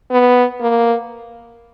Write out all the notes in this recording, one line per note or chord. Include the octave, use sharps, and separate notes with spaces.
B3
A#3